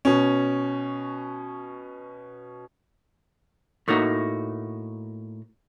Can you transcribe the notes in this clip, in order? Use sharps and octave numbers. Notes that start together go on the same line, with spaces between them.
B2 C#4
A2 A3 A#3 D#4 F#4